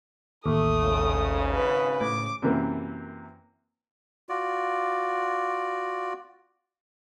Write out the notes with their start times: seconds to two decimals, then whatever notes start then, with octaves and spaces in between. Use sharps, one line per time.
0.46 A1 D#2 A3 D#6
0.82 G#1 C#3
1.54 B4
2.01 A2 D6
2.42 F#2 C3 E3 A#3
4.29 F4 F#4 D5